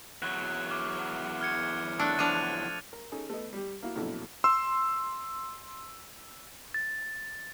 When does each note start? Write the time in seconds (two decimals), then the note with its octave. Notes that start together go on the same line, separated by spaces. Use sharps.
0.22 E2 F#3 F#6
0.71 D6 F6
1.41 F6 G#6 C#7
1.99 A3 D4 F#6 A6
2.19 F3 D4 D#7 F7
2.93 A#4
3.12 C#4 D#4 G#4 A4
3.30 A3 B3 D#5
3.53 G3 G4
3.83 A#3 E4 F#4
3.95 A#1 F2 B2 F#3 A3 E4
4.44 C6 E6
6.74 A6